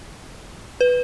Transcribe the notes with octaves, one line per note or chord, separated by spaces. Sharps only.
B4